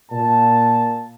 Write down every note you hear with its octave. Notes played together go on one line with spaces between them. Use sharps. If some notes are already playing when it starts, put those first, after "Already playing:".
A#2 A5